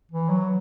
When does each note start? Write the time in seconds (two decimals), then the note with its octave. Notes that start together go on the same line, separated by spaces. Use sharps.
0.12 E3
0.30 F#3